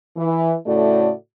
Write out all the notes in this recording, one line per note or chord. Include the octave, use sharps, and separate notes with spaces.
E3
A2 C#3 A3 F#4 D5